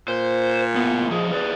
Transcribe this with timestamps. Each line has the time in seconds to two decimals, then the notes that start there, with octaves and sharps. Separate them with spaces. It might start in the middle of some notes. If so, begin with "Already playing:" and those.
0.08 A#2 C5
0.75 A2 B3
1.11 F3 G#4 D#5
1.31 G#4 B4 D5